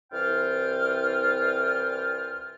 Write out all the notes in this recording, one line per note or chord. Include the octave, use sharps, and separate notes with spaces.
C2 E3 F4 G5 F6